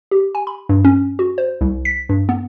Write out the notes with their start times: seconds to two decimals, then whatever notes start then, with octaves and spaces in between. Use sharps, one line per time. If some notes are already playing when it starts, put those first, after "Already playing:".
0.11 G4
0.35 G#5
0.47 B5
0.69 G2
0.85 C#4
1.19 F#4
1.38 C5
1.61 C2
1.85 B6
2.09 G2
2.29 B3